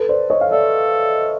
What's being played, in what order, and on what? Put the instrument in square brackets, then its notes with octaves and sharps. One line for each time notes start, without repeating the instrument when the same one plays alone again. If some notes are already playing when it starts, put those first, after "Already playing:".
Already playing: [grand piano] A4 B4
C5 D5
C#5 D#5
F5
[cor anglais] A4 [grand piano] D5 E5